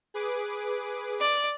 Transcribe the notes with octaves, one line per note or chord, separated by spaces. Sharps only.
G#4 B4 D6
D5